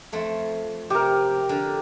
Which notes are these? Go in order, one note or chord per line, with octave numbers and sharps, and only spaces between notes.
F2 F3 A3
C3 G4 A#4
D3